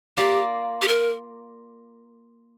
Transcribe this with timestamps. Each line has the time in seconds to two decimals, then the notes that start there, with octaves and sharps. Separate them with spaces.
0.17 A#3 F4 G4 D5
0.82 G4
0.88 A#4